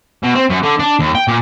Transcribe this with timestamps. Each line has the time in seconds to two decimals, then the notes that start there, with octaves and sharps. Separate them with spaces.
0.23 B2
0.35 C4
0.49 F#2
0.63 D3
0.79 D4
0.99 D#2
1.15 G5
1.28 A#2